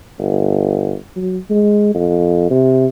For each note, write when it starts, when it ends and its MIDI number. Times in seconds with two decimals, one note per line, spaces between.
0.19 0.96 31
1.16 1.38 54
1.50 1.90 56
1.95 2.50 41
2.50 2.87 48